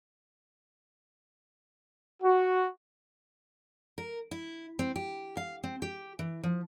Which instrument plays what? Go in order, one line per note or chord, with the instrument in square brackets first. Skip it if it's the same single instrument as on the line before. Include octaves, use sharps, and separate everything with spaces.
[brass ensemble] F#4
[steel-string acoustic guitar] A#4
E4
C4
G4
F5
C4
G4
E3
F3